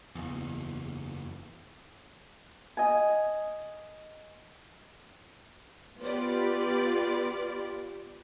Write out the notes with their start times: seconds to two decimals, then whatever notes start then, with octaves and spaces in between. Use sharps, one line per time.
0.15 F#1 E2
2.77 D#5 G#5
6.00 B3 F4 G4 B4 D5